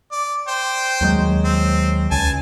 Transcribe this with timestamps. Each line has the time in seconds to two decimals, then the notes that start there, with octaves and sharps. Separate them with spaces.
0.12 D5
0.48 C5 G5
1.01 D#2 F#3 G#3
1.44 C4
2.11 C#2 G#5 A5